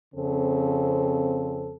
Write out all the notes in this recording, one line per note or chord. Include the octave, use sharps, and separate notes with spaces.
F2 C#3 C4 A4